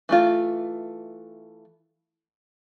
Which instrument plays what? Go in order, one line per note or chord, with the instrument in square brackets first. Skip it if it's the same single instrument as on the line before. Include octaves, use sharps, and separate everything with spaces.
[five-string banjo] E3 A3 F4